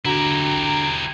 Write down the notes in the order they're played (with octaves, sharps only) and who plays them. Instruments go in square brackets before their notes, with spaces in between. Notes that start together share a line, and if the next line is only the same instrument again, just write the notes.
[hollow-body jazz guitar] D3 F#4 [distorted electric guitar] E4 G4 [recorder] A#5